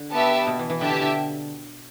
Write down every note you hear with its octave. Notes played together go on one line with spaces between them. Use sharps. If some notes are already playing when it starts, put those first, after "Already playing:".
Already playing: D3
B3 G4 B4 E5 A5
B2
E3
E3
D3 G4 E5 A5
E3
D3